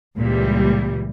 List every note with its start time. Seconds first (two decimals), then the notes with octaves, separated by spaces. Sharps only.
0.16 C#2 A#2 E3 G3